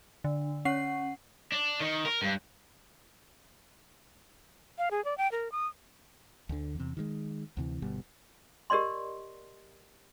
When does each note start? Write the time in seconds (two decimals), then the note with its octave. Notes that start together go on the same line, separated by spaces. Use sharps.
0.24 D3
0.65 C#4 F#5 C7
1.52 D4
1.80 D#3
2.06 A#4
2.22 G2
4.78 F5
4.91 G#4
5.05 D5
5.18 G5
5.32 A#4
5.52 D#6
6.49 D2 D3
6.75 E2 C3
6.97 D#3 F3 G#3
7.57 D2 C3 E3
7.82 G1 B2 G3
8.70 G4 A#4 D5 D#5 C6